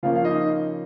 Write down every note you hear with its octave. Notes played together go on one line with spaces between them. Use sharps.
C#3 F3 A#3 C#4 F4 F5
F5
D#4 D#5